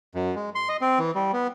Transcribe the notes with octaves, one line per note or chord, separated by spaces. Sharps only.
F#2
G#3
C6
D#5
C4
E3
G3
B3